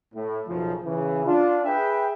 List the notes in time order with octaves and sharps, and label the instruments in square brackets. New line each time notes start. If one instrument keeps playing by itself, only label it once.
[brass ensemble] A2
B1 F#2 C#3 F3
C#3 E3
D4 F4
G#4 B4 E5 G5